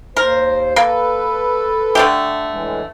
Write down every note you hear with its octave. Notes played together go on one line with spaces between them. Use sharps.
D#2 A#4 C5
A#3 A4 B4
D3 A3 G4
A2 E3 G#3